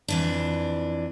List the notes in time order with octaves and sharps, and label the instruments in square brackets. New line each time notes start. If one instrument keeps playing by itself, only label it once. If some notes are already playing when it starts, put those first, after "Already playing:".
[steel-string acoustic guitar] F2 E3 D4